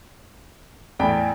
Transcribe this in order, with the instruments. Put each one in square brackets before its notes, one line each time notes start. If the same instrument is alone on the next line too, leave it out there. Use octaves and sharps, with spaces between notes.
[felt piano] E2 A2 [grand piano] D5 G5 B5